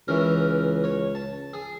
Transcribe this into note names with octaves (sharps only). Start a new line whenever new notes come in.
C#2 E3 C#4 A#4
C#5
A5
G#4